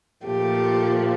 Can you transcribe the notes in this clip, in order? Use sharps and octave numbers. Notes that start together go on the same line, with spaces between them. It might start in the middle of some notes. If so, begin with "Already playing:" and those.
A#2 F3 A3 G4